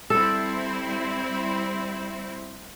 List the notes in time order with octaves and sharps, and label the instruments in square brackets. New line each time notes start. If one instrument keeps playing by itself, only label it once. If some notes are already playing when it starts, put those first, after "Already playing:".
[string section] G3 C4 E4 [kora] A4